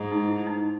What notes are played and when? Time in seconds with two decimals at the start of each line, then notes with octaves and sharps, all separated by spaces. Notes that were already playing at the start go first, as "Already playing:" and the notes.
Already playing: G#2
0.12 D#4
0.28 E4
0.46 D#4